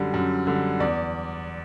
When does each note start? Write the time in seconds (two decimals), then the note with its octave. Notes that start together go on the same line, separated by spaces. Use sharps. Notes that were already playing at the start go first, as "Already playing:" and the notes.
Already playing: F#2 D3 G3
0.14 F#2
0.47 D3 G3
0.80 E2 D5